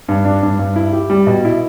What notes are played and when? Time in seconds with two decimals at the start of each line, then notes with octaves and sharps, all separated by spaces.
0.08 G2
0.25 D4
0.43 G2
0.59 G2
0.76 E4
0.93 G4
1.10 G3
1.27 B2
1.45 E4